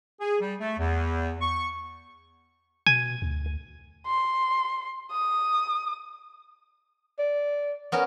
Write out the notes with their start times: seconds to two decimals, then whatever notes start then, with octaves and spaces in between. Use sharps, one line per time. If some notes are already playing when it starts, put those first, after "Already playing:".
0.21 G#4
0.40 G3
0.60 A3
0.78 E2
1.41 C#6
2.87 B2 G#5
3.22 D2
4.06 C6
5.12 D#6
7.19 D5
7.92 B3 C#4 A#4